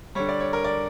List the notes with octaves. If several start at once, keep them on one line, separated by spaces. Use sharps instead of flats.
D3 G3 C#5
D5
C#5
A#4
D5